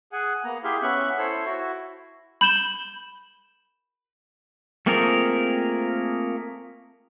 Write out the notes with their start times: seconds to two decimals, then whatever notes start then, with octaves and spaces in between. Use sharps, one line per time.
0.12 G#4 F#5 G#5
0.44 A#3 B3 A#5
0.64 E4 G4 G#4 E5 F5 C6
0.82 B3 C#4 E5 C#6 F#6
1.18 E4 A4 C5 C#5
1.45 E4 F#4
2.41 B5 G6 E7 G7
4.86 A3 A#3 C4 F4 G#4 A#4